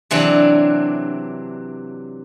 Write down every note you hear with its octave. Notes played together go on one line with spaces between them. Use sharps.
C3 E3 F#3 D4